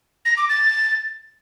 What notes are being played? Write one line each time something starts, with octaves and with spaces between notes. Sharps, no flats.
A#6
D6
A6